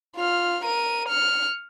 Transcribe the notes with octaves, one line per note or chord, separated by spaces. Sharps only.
F4 F6
A#4 D#7
F6 C#7